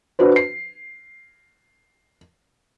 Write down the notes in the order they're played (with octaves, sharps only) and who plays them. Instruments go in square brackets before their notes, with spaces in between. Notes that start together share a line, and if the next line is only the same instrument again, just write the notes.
[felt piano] D4 F#4 B4 C5
C7